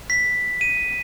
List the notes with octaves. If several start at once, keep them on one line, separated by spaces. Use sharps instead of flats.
B6
D#7